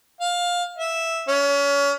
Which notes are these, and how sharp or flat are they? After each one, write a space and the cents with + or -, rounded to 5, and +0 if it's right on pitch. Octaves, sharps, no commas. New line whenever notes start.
F5 +15
E5 -5
C#4 +30